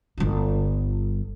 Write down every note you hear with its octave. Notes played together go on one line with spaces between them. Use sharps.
G1 G3